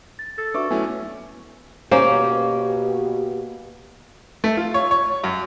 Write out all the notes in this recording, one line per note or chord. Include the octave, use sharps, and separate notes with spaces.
A6
A4 A6
D4 F#4 B4 E5 C#6 D6
F#3 A3 B3 C#4 E4 G#5
B2 A#3 C#4 G4 C5
A3
F4
C#5
C#5
F#2